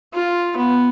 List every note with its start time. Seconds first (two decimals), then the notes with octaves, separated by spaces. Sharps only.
0.13 F4
0.57 B3